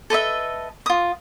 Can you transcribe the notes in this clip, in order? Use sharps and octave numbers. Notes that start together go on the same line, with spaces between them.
A4 B4 D#5 E5
F4 D#6